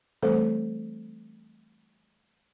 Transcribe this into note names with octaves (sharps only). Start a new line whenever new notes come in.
E3 G3 A3 C4 A4 C5